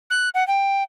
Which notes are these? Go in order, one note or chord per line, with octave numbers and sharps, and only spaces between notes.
F#6
F#5
G5